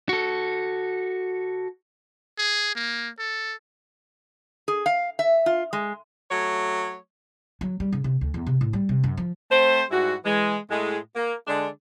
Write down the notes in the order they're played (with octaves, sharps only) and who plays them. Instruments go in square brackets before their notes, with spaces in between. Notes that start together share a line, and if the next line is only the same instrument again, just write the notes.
[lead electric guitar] F#4 A4
[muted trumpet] G#4
A#3
A4
[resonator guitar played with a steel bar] G#4
F5
E5
F4
G#3
[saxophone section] F#3 A3 C#5
[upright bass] F#3
G3
C#3
C3
D2
E2
C3
A2
G3
C3
F#2
F3
[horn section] A3 C4 C5
G#2 G3 E4 F#4
E3 G#3
A2 G#3
A#3
D3 G#3 D4